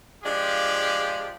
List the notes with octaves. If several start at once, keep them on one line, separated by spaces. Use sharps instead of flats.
F3 G#3 D4 F4 G4